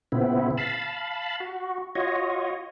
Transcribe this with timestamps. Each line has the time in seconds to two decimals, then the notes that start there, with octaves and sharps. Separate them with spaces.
0.12 A#2 C#3 B3 C4 E4
0.58 F5 A5 B5
1.40 F#4
1.95 F4 F#4 C#5 D#5